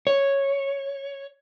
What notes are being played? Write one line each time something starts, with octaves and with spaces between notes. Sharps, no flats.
C#5